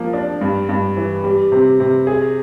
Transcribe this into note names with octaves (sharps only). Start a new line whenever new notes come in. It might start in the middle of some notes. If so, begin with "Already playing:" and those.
Already playing: F3 A#3
D4
G2
G2
E3
G3
C3
C3
G#4